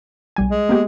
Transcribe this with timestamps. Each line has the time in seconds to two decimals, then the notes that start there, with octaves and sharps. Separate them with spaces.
0.36 B1 G3 G#5
0.50 G#3
0.69 A#3 B3 G4